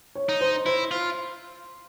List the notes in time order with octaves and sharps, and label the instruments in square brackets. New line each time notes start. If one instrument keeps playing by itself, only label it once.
[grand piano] C#5
[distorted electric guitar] D#4
[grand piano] C5
[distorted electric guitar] E4 [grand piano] C5
[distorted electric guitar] F4